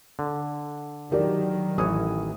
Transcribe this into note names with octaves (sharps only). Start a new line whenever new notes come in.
D3
D#3 F#3 G3 G4 A#4 D5
A1 E3 C#5 D#6